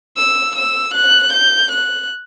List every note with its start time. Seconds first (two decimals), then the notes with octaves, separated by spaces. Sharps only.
0.17 E6
0.56 E6
0.94 F#6
1.33 G6
1.72 F#6